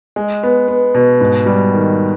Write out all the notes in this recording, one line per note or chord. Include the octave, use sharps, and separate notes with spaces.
G#3
B3
B3
B2
G#2
G3
D#3